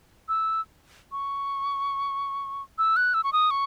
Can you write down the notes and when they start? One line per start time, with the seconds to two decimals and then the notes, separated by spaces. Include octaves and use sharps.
0.29 E6
1.12 C#6
2.78 E6
2.97 F#6
3.14 E6
3.24 C#6
3.33 D#6
3.51 C#6